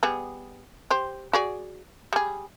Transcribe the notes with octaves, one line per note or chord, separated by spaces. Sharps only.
G3 B3 G#4
G4 C5
F#4 G#4 D5
G3 G#4